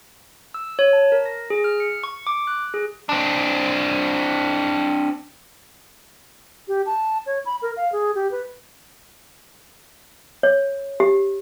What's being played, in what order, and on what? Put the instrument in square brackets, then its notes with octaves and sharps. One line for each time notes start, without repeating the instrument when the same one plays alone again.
[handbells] E6
C#5
A5
A#4
A#6
G#4
F6
C#7
C#6
D6
F#6
G#4
[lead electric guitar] C4 D4
[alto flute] G4
A5
C#5
B5
A#4
F5
G#4
G4
B4
[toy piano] C#5
G4